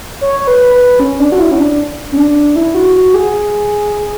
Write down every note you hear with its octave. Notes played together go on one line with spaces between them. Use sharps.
C#5
C#5
B4
B4
C#4
D4
F#4
E4
C#4
D4
C#4
D4
E4
F#4
F#4
G#4